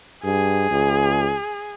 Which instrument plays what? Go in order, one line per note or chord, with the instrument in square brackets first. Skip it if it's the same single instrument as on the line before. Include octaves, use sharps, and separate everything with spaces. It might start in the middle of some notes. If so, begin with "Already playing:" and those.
[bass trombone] G2 [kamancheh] G#4
[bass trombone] C#2